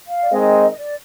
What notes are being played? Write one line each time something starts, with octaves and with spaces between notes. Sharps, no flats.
F5
D5
D#3 G#3 C4 D#4 D#5
D#5
D5